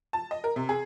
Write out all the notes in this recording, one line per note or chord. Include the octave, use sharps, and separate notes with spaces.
A5
D#5
A#4
C3
G#4